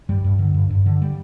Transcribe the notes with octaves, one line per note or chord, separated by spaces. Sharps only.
G2 G3
G2
D3
G2
G2
D3
G3